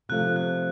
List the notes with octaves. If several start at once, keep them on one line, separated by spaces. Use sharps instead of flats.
C3 F3 A3 F#6
F#6